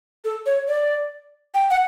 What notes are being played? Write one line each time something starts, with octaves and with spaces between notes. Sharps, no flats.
A4
C#5
D5
G5
F#5